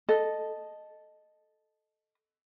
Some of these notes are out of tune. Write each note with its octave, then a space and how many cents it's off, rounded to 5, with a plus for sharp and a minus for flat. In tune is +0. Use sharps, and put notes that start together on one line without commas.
A4 -5 D#5 -5